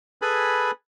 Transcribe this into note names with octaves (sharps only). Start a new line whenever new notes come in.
G#4 A4 B4 G#5 B5